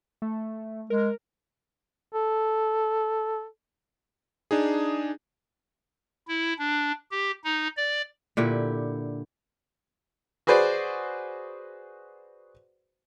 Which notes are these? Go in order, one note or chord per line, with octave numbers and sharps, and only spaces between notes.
A3
G#3 A#4
A4
D4 D#4 G#4
E4
D4
G4
D#4
D5
A#2 D3 E4 G4
F#4 G#4 B4 C5 D5